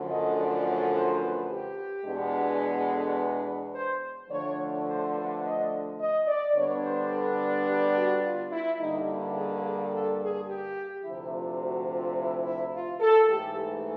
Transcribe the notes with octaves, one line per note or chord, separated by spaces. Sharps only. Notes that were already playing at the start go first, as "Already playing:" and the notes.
Already playing: F#2 D3 F3 A3
D#5
D5
C#5
C5
B4
G4
E2 B2 G#3 B3 D4
G#4
A4
B4
C5
D3 F3 A3 D4 C#5
C#5
C5
B4
D#5
D#5
D5
D3 G3 B3 D4 C#5
C5
A4
A4
G4
F#4
F4
E4
G2 D3 G3 A#3 D#4
E4
G#4
G#4
A4
G#4
G4
D2 C3 F3 E4
F4
F#4
F4
E4
E4
F4
A4
G#2 E3 A3 G4
G4